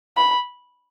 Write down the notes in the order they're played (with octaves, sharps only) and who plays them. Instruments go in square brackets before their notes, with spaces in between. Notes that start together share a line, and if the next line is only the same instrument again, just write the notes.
[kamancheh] B5